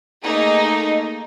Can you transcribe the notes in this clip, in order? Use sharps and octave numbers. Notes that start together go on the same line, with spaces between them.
A3 A#3 D#4 G#4